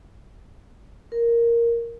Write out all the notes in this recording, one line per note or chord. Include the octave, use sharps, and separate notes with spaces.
A#4